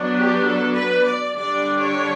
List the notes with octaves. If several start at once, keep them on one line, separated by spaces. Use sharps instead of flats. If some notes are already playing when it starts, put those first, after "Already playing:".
Already playing: F#3 B3 D4
G4
A4
B4
D5
D3 G3 D4 D5
C#5